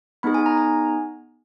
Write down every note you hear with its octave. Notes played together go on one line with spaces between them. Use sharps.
B3 D#4 G#4 B5
G#5
A#5
G#5